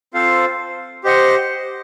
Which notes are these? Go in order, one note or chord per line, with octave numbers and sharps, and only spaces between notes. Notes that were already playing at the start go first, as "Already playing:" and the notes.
C4 F4 A4 C5 F5
G4 C5 D#5 F#5